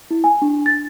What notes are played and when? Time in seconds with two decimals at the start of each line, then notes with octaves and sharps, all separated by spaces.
0.11 E4
0.24 G#5
0.42 D4
0.66 A6